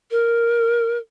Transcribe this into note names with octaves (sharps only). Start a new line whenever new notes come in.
A#4